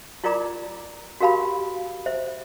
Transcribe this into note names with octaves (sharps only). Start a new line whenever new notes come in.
E4 F4 A#4 D5 A#5 D6
F#4 G4 A#4 F5 A5 B5
C5 E5